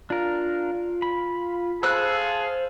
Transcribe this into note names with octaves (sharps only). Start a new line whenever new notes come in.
D4 F4 A#4
B5
G#4 A4 C5 F5 E6 F#6